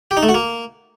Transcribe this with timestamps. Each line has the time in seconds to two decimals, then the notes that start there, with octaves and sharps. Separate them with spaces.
0.11 G4
0.17 D#4
0.23 A3
0.29 F#4
0.34 A#3